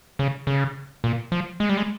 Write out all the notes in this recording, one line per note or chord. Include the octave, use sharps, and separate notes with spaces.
C#3
C#3
A#2
F3
G#3
G3
G#3